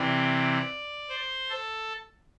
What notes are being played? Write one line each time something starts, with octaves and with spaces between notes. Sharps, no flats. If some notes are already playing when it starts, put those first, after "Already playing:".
Already playing: C3 E3 C4 D5
C5
A4